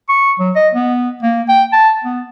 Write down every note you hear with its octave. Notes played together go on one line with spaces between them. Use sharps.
C#6
F#3
D#5
B3
A#3
G5
A5
B3